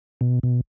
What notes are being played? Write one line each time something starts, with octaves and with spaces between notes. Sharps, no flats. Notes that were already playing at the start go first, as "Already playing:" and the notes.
B2
B2